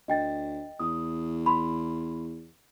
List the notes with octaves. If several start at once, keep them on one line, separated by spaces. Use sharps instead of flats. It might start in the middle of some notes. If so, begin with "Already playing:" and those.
D2 D#5 G5 A6
E2 D#6
B5 C6